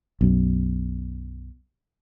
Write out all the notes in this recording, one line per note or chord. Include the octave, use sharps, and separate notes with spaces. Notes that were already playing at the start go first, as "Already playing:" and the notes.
B1 F#2